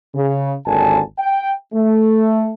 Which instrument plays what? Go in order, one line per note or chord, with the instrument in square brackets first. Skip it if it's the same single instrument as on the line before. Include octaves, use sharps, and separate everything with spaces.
[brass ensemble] C#3
G#1 D#2 D3 G#5 A5
G5
A3